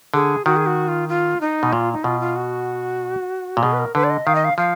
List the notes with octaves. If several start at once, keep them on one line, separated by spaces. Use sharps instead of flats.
D3 G#4
D#3 F#4
G#4
F#4
F4
F4
D#4
B2
A#2 F4
D#4
B2 F4
F4
F#4
A#2
B2 G#4
B4
A#4
D3 B4
D5
D#5
D#3 F5
D#5
F5
F3 F5